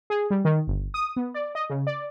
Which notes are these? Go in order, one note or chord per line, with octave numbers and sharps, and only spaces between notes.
G#4
G3
D#3
G1
D#6
B3
D5
D#5
C#3
D5